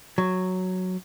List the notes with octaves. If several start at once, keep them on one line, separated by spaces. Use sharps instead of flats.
F#3